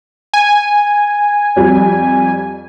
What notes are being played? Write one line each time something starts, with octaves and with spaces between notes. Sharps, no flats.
G#5
F2 F3 G3